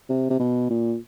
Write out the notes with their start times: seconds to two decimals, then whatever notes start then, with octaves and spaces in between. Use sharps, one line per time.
0.09 C3
0.30 C3
0.40 B2
0.70 A#2